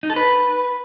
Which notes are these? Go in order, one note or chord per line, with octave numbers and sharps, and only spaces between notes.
D#4
A4
B4